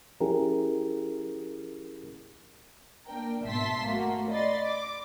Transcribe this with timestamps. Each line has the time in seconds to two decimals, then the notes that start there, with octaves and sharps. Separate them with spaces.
0.21 F3 C#4 E4 G4 G#4 A#4
3.06 A#3 D4 A#4 G5
3.44 G#1 B2 E5 A5 C6 B6
3.84 A3 A#3 F#4
4.29 D5 D#5 B5 C6 A6
4.65 D6